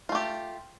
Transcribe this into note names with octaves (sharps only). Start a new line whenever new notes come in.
A3 F4 G4